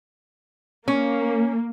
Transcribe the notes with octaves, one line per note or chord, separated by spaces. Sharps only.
A#3 C#4